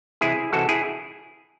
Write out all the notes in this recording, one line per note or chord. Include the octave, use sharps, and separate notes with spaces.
C3 E3 G#3 E4 G#4
C3 E3 G#3 F#4 A4
E4 G#4